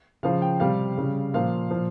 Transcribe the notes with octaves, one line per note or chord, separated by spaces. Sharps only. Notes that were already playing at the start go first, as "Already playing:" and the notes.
C#3 F3 F5
G5
C3 G3 F5
C#3 G3
A#2 F3 F5
A#2 F3